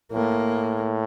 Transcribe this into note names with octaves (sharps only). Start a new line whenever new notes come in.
A2 A#3